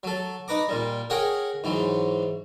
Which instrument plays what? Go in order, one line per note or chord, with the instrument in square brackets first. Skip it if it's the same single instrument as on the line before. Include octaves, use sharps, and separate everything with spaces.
[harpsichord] F#3 A4
D#4 B4 A#5 D6
A#2 G3
G#4 A#4 C#5 F#5 G5
G#2 E3 F#3